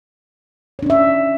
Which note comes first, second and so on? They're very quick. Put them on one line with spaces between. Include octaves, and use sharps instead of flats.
C#5 D4 C#4 E5